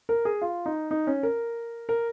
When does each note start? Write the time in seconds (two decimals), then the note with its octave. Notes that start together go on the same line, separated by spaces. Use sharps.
0.09 A#4
0.25 G#4
0.42 F4
0.66 D#4
0.91 D#4
1.07 C#4
1.23 A#4
1.89 A#4